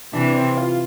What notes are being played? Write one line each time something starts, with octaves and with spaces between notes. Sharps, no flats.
C3 E3 D4
C4
F4